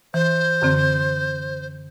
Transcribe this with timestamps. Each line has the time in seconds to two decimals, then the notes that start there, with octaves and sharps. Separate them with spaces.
0.14 E3 C5
0.62 F#2 D3 C4